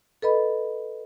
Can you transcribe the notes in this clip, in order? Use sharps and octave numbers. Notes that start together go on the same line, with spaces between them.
A4 B4 D#5 B5